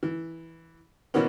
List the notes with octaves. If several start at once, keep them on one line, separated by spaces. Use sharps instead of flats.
E3
B2 E3 A#3 B3 C#4